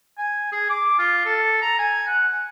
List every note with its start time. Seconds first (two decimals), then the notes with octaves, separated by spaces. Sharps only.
0.18 G#5
0.53 G#4
0.70 D6
0.99 F4
1.25 A4
1.62 A#5
1.79 G#5
2.07 F#5